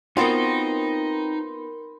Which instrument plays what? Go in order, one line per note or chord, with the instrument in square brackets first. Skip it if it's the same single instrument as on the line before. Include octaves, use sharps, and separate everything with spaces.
[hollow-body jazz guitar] B3 F4 F#4 [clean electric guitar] C4 [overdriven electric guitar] D#4 [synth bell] A#4 B5 C6